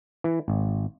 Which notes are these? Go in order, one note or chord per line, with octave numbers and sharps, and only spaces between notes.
E3
G#1